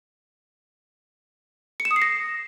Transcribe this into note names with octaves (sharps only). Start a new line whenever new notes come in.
C#7
E7
D#6
C7
A#6